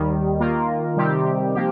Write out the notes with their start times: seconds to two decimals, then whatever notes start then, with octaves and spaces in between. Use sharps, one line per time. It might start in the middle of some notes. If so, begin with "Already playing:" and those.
Already playing: D#2 D#3 G3
0.40 D#3 A#3 F4 A#4
0.97 C3 D#3 G3 C4 G4
1.55 F3 A#3 G4